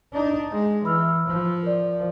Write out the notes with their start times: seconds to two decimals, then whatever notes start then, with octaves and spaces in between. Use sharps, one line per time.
0.13 D4 D#4
0.52 G#3
0.85 E3 B5 E6 F6
1.27 F3
1.63 A#4 D5